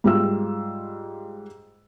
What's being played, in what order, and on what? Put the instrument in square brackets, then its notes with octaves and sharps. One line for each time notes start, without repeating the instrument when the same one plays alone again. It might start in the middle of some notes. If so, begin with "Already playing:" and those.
[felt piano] G#2 G3 F4 E6